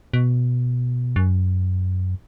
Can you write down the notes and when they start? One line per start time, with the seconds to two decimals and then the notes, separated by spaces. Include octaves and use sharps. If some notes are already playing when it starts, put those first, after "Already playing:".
0.14 B2
1.16 F#2